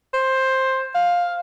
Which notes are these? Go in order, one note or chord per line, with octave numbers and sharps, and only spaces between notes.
C5
F5